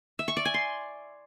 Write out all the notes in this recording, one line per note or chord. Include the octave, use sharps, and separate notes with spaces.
E5
C#6
D5
G#5
C6